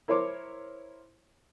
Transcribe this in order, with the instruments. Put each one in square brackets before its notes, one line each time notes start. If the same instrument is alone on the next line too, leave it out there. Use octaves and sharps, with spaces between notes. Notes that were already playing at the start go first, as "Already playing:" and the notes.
[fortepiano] E4 A#4 C5 C#5 C6 D6